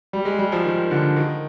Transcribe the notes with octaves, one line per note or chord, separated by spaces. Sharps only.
G3
G#3
G3
F3
D#3
D3
D#3